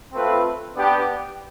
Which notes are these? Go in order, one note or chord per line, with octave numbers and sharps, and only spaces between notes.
A3 C4 F4 B4
B3 D4 G4